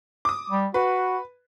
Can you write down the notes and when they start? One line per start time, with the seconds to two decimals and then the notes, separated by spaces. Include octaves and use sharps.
0.25 D6 D#6
0.50 G3
0.74 F#4 B4